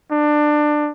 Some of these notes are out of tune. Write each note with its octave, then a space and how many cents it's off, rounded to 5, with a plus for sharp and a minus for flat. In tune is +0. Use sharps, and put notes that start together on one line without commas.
D4 +20